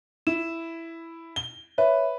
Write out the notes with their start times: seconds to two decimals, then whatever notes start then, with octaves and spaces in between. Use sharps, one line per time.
0.27 E4 E7
1.36 G7
1.78 B4 C#5 E5